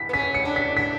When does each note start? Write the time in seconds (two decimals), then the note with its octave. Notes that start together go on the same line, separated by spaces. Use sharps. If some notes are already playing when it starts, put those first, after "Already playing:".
Already playing: B6
0.09 B3
0.13 C#4 B6
0.34 C#7
0.45 D4
0.56 B6
0.77 D4 B6